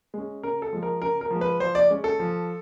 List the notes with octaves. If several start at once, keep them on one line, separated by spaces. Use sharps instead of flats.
G#3 C#4
C#3 A#4
A4
F3 G#3
A#4
C#3 A#4
A#4
F3 G#3
B4
F3 C5
D5
G#3 C#4
A4
F3